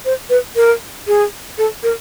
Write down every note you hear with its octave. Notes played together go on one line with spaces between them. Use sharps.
C5
B4
A#4
G#4
A4
A#4